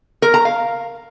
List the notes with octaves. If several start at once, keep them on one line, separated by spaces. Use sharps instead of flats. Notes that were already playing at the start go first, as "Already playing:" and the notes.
A#4
A#5
F5